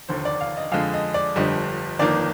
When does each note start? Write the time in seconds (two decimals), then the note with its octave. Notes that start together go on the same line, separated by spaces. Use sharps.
0.09 F1 D#2 D3 C5
0.25 D5
0.41 F5
0.57 D#5
0.72 F2 D3 G#3 F5
0.94 D#5
1.14 D5
1.36 G1 F2 D3 G3 D#5
1.99 G1 F2 D#3 A#3 D5